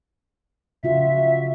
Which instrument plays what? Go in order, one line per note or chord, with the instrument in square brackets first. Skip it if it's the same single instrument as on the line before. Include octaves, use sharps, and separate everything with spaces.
[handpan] C#3 F4 F#4 [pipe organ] E5